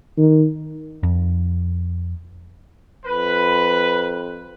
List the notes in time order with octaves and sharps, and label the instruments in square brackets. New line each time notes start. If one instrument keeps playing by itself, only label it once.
[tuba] D#3
[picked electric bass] F2
[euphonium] F2 [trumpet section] B4